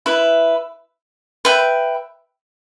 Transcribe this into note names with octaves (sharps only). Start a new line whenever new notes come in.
E4 B4 E5
B4 E5 G5